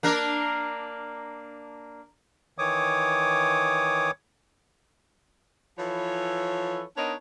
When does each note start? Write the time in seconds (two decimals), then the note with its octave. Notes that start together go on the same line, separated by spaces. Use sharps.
0.03 A#3 D4 A#4
2.58 D#3 E3 C#5 D6 D#6
5.79 E3 F3 A4 B4 C#5
6.97 B3 D4 D#4 A#4 C#5 D#5